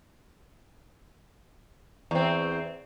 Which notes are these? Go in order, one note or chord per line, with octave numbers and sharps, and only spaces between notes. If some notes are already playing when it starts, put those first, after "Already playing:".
E2 C4